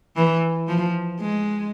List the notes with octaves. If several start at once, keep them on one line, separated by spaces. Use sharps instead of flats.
E3
F3
G#3